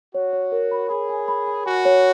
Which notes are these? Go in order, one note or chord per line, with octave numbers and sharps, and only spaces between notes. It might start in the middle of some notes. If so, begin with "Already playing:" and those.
F#4 C#5
C#5
A#4
B5
G#4 B5
G#5
B5
B5
F#4 G#5
C#5